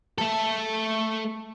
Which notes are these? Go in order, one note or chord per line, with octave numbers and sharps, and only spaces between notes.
A3 A4